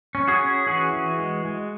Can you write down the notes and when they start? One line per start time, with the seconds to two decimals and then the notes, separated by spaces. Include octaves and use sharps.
0.15 C#4
0.28 F#4 G#4
0.42 C#4
0.66 E3 F#4 G#4
0.93 E3
1.18 G#3
1.45 G#3